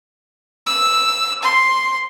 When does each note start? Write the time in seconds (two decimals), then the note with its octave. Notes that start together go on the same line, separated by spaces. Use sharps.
0.66 E6
1.42 C6